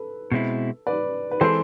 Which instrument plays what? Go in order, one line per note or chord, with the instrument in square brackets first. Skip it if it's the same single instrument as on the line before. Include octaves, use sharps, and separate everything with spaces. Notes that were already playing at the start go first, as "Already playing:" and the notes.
Already playing: [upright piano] A4 B4
[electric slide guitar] B2 G#3 C4 E4
[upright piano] B4 D5
B4
[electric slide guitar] E3 G#3 C4 G#4 [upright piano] A4 C5